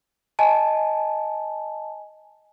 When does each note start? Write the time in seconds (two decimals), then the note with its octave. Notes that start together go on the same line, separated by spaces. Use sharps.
0.39 D#5 G#5 A5